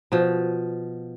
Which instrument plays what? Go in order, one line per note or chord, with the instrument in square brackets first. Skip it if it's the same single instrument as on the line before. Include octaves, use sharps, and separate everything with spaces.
[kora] B2 F3